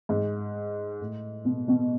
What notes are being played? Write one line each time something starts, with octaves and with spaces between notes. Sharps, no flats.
G#2
A2
B2
B2